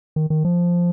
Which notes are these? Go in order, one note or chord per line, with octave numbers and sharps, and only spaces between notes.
D#3
D#3
F3